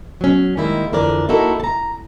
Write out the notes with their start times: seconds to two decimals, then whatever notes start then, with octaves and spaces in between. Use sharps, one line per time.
0.21 F#3 C#4
0.57 D#3 G3 G#3 A#3 E4
0.92 F2 D3 E3 A#4 D5
1.29 A#3 D#4 E4 F#4 A4 A#4
1.60 A5 A#5